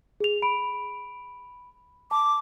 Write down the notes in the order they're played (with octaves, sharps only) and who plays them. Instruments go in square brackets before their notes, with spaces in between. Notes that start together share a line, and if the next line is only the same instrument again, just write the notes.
[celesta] G#4 F7
B5 D7
[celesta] A5 [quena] D6